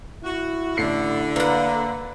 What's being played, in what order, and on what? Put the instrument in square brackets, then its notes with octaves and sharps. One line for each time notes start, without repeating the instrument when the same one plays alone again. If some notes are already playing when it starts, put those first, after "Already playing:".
[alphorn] E4 [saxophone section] F#4
[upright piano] A1 C7 C#7 [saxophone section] D3
[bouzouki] A#3 F#5 [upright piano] B4